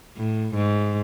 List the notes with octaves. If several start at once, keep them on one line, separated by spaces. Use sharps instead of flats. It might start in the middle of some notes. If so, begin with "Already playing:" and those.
A2
G#2